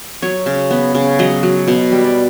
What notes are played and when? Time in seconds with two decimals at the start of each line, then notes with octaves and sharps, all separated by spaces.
0.22 F#3 C#5
0.46 C#3
0.71 B3
0.95 C#3
1.19 F#3 D#5
1.43 F#3
1.68 B2
1.92 G3
2.04 D5